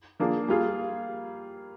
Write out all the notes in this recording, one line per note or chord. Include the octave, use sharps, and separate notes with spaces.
F3 A#3 D4 G#4
G3 A#3 F4 G#4